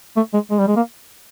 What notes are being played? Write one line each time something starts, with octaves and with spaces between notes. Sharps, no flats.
A3
G#3
G#3
G3
G#3
A#3